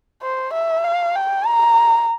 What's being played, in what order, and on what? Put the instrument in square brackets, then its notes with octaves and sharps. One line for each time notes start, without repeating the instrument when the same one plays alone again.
[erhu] C5
E5
F5
G5
A#5